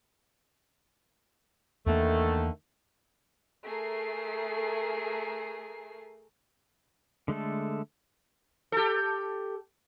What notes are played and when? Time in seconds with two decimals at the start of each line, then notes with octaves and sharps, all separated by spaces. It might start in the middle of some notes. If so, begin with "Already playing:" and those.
1.86 E2 D3 D#3 A3 A#3
3.67 A3 G#4 A#4 C7
7.28 D3 G#3 A3 A4
8.72 G4 A4